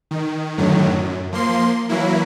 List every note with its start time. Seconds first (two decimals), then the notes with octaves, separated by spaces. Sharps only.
0.11 D#3
0.58 F#2 A2 D3 D#3 F#3
0.90 F#2
1.32 F3 A#3 C6
1.89 E3 F#3 A#3 E4